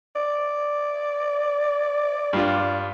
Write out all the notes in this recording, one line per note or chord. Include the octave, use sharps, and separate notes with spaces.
D5
G2 F4